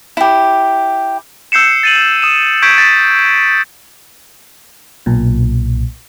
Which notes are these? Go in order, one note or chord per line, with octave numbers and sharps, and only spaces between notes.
E4 G4
E6 G6 C7 C#7 E7
A6 D#7 F#7
D#6 E7
C#6 G6 G#6 B6 D7
G#6 A6 B6
B1 A#2